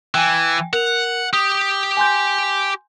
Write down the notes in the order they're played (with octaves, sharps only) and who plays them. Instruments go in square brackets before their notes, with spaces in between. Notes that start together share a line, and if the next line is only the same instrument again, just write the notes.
[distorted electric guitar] E3 [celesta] G5 G#5
[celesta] A#4 F7 [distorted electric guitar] F#5
[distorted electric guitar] G4 [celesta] D#6
[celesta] G#5 C6 G6